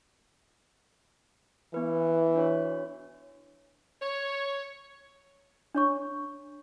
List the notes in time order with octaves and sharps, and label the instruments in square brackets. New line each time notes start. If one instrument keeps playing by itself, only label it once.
[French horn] E3 [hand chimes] B3 B4
[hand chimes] D4 F#4 C#5
[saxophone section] C#5
[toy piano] D4 C#5 C#6